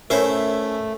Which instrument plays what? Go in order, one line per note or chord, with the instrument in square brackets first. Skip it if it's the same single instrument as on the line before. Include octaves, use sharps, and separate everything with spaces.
[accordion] A3 [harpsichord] C#4 E4 C5 [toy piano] A#4 C#5